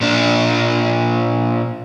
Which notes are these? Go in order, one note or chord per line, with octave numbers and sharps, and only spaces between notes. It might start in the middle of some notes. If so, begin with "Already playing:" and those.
A#2 D4